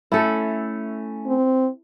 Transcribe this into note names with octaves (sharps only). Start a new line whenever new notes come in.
A3 C#4 E4 A4
C4